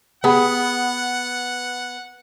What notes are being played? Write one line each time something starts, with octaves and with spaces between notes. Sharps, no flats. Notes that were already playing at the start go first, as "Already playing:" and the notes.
B3 G4 G#4 F#5 B5